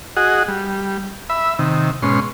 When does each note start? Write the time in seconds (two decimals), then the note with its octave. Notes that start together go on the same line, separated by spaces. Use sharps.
0.17 F#4 G#4 D#5 F#5
0.48 G3
1.30 E5 B5
1.59 C3 D#3
2.03 G#2 B2 C#4 C6